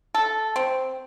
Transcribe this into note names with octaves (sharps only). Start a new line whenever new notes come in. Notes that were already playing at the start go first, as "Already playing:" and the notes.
A4
C4